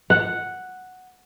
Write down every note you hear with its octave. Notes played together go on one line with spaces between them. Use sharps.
F#5